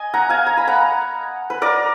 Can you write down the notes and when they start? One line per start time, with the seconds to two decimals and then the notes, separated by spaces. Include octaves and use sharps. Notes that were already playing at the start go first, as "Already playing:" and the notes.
Already playing: D#5 G#5
0.14 F#5 A#5
0.29 F5 G#5
0.47 A#5
0.57 B5
0.68 F#5 A#5
1.50 B4
1.62 A#4 D5